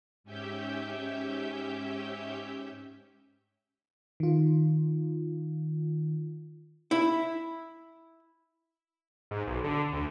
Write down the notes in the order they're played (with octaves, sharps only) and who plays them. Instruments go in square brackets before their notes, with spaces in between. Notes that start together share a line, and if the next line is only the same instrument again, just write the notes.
[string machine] G#2 C#4 G4 E5 G6
[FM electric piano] D#3 F4
[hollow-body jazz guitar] E4
[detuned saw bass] G#2
B1
D3
D2